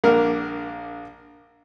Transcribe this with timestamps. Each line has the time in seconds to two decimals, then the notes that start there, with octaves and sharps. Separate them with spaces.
0.04 A#1 A#3 D4 A#4 F#5